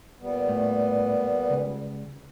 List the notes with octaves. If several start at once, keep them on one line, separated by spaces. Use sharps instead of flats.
A#2 G3 B3
A2
C#2